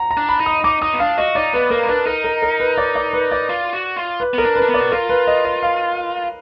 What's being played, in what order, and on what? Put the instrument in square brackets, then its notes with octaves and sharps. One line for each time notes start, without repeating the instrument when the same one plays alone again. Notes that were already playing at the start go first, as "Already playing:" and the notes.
Already playing: [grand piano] F#5 A#5
A#5
[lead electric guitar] D4
[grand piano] B5
[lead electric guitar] D#4
[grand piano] D#6
[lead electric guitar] D#4 [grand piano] D6
[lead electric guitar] D#4 [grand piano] D#6
[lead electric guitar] B3
[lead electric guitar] D4 [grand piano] F5
[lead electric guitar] F#4 [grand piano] D#5
[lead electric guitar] D#4 [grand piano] D5
[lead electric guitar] B3 [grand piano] B4
[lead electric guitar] A#3 [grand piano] A#4
[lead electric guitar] B3
[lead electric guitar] D4 [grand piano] B4
[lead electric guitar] D#4 [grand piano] A#4
[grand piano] A#4
A#4
B4
D5
D5
B4
D5
[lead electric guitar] F4
F#4
F4
[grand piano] B4
[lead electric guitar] B3 [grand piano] A#4
[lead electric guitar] D4
[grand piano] B4
[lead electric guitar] D4
B3
[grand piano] D5
[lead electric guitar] F#4
[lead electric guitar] F4 [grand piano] A#4
[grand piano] B4
D#5
D#5
F5